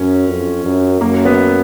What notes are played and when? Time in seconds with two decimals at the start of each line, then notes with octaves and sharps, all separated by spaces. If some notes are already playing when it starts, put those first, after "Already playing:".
Already playing: F#2 C#4
0.29 F2
0.65 F#2
1.01 F#2 A#3
1.25 B3